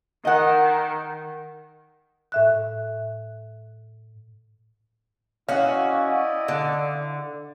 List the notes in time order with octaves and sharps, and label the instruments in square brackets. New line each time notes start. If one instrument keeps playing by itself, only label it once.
[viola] D#3 [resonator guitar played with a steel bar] D#5 F#5
[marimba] A2 E5 F#6
[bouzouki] C#4 F#4 [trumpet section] E4 D5 D#5 [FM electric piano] F5
[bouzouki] D3